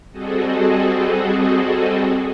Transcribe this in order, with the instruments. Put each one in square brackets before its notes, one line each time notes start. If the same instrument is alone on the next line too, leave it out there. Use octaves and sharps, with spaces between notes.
[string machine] G3 C4 F#4 G#4 A4 D#5